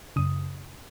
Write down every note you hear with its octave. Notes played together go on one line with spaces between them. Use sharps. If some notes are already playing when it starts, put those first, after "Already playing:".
F#2 C#3 D#6